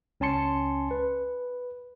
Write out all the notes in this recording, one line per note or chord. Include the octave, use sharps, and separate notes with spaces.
C#2 C#4 G#5 A5 C6 C#7
B4